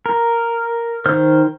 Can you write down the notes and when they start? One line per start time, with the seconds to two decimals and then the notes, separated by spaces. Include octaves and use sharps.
0.06 A#4
1.06 D#3 C5 F6